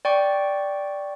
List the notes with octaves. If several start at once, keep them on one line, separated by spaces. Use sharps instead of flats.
D5 G5 C#6